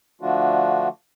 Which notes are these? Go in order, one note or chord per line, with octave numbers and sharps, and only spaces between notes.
D3 F3 A3 D4 F4 F#4